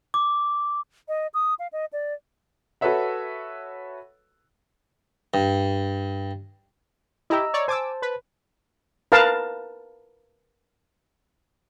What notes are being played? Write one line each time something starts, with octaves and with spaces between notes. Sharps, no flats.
D6
D#5
D#6
F5
D#5
D5
F#4 A4 B4 C#5 E5 F#5
G2
E4 G4 D#5 A#5 E6
C#5 D5
C5 G#5 A5 D6 E6
B4
A#4 B4 F5 A5